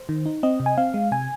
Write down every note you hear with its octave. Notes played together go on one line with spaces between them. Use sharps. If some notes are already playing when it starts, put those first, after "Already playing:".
Already playing: C5
D#3
D#4
C4 D#5
C3
G#5
C4 F5
G#3
C3 G#5